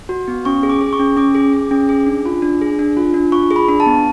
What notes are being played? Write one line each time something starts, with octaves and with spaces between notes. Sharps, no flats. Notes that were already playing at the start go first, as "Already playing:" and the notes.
F#4
B3
C#4 C#6
G#4
D6
G#4
C#6
C#4
C#4 D6
G#4
G#4
C#4
G#4
D4
F4
D4
G#4
D4
F4
D4
F4 C#6
G#4
B5
D4
A5
B3